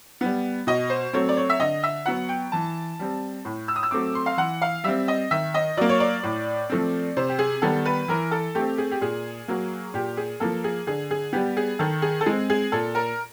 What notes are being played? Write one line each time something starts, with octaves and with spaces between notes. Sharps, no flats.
G3 B3
B2 D#5
C5
F#3 A3 C4 C#5
D5
C#5
E5
D3 D#5
E5
F#3 B3 F#5
G5
E3 A5
G3 C4
A2
E6
D#6
E6
F#3 A3 C4 D6
C6
F5
E3 F#5
F5
G3 C4 E5
D#5
D#3 E5
D#5
F#3 A#3 D5
C#5
D5
A2
F3 A3 C4
C3 C5
G4
G#4
D#3 G3 B3 A4
B4
E3 A#4
A4
A3 C4 G4
G#4
G4
A#2 G#4
F#3 A#3
A#2 G4
G#4
F3 A#3 A4
G#4
D3 G#4
G#4
G3 B3 G4
G#4
D#3 A4
G#4
A4
G#3 C4 G#4
G#4
A#2 A4
A#4